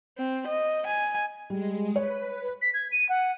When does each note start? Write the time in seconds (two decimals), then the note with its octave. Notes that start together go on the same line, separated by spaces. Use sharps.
0.18 C4
0.47 D#5
0.87 G#5
1.50 G3 G#3
1.96 B4 C#5
2.61 B6
2.74 G#6
2.92 D#7
3.09 F#5